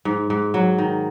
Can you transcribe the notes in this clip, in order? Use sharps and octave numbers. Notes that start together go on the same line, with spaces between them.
G#2
G#2
F#3
D#3